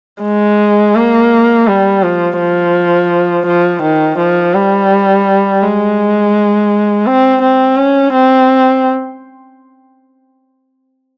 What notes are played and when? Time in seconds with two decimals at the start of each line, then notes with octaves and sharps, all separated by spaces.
0.23 G#3
0.95 A#3
1.68 G3
2.03 F3
2.39 F3
3.47 F3
3.83 D#3
4.19 F3
4.54 G3
5.63 G#3
7.06 C4
7.42 C4
7.77 C#4
8.14 C4